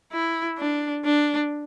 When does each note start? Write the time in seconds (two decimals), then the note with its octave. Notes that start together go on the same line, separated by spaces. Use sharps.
0.12 E4
0.58 D4
1.05 D4